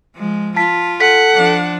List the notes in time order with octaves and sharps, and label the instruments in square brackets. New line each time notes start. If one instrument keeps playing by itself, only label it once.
[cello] F3 G#3
[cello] F4 [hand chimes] A5 B6
[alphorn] A4 [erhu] F#5 [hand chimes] B6
[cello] F3 D4